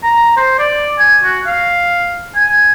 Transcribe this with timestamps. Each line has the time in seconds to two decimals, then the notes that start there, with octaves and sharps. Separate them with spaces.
0.03 A#5
0.37 C5
0.59 D5
0.99 G#5
1.24 F#4
1.47 F5
2.36 G#5